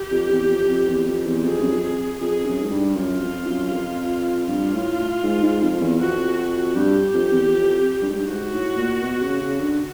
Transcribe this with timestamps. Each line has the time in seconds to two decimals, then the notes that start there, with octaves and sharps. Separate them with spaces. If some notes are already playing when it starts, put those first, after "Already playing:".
Already playing: G4
0.11 F2
0.31 E2
0.49 F2
0.69 F2
0.88 E2
1.07 F2
1.26 E2
1.44 F2 G#4
1.60 F#2
1.69 F2
2.20 F2 G#4
2.45 F#2
2.62 G#2
2.70 G2
2.96 F#2 F4
3.21 F2
3.46 F#2
3.72 F2
4.48 G2 F4
4.73 A2
5.23 G#2
5.43 G#2
5.62 F2
5.81 E2
5.99 F2 F#4
6.37 F#4
6.75 G2 G4
7.13 F2
7.32 E2
7.52 F2
8.01 G2
8.09 G#2
8.16 G2
8.27 G#2 F#4
8.53 A2
8.77 A#2
9.02 B2
9.21 C#3
9.41 C#3
9.60 D3